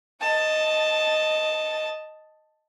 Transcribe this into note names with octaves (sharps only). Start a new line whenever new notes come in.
D#5 A5